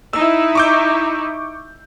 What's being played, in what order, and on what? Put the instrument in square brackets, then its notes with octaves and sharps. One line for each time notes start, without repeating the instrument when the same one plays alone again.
[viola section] D#4 E4 [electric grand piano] E6
[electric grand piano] C#6 D6 G6